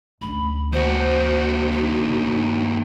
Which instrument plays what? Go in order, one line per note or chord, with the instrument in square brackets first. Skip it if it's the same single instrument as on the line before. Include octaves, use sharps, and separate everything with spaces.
[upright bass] D2 C#4 [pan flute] B5
[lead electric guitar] D#2 F#4 [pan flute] C5
[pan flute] D#4
[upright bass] G2 C#3